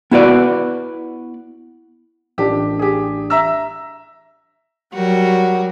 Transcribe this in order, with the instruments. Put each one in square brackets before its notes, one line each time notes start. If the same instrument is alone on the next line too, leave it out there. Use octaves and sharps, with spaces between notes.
[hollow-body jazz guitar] B3 E4 F#4 B4 D5
[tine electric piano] A1 D4 [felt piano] G4
[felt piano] G4 G#4
E5 A#5 E6
[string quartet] F#3 G3 F#4 A#4